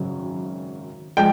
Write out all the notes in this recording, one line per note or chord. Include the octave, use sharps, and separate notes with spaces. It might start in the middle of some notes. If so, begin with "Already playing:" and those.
Already playing: G#1 F#2 C#3 F#3
F3 G#3 G5